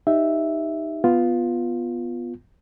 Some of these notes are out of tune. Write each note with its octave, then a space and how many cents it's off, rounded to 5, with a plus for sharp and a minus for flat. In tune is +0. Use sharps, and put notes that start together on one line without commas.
D#4 +0 G4 +0 E5 +0
B3 +0 F4 +0